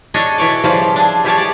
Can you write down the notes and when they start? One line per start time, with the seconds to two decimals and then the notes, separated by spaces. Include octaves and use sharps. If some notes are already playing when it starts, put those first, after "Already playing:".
0.14 D4 G#4 A4 C#5 D#5
0.38 B2 E3 C#5 D5
0.64 C#3 E3 F3 G3 C5 F5
0.96 D4 G#4
1.24 E3 G3 G4 G#4 C#5 A5
1.38 G#4 D5